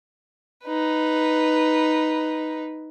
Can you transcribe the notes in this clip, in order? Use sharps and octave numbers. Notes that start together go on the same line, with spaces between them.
D#4 B4